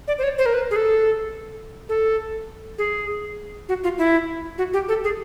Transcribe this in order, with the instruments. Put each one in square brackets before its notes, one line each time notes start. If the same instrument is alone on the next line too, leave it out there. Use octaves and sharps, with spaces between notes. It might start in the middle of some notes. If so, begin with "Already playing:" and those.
[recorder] D5
C5
C#5
C5
A#4
B4
G#4
A4
A4
G#4
F#4
F4
E4
F#4
G4
A4
G#4